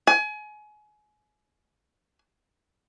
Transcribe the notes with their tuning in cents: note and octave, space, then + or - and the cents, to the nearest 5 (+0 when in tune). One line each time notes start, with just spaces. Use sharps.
G#5 +30